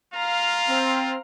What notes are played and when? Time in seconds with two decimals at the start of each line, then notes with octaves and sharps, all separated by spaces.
0.14 F4 F5 A#5
0.68 C4